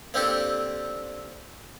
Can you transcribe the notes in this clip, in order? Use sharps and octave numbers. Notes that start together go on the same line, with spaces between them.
A#3 C4 D4 G4 A4